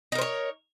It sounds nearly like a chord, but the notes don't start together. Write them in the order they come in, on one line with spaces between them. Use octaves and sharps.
D#4 A#4 C5 C#5